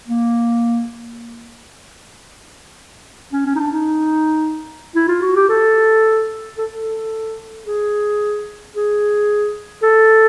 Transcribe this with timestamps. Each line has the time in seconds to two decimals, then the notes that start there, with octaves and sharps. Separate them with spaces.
0.08 A#3
3.33 C#4
3.46 C#4
3.56 D#4
3.59 D4
3.73 D#4
4.95 E4
5.08 F4
5.22 F#4
5.36 G4
5.49 A4
6.58 A4
6.72 A4
7.66 G#4
8.74 G#4
9.83 A4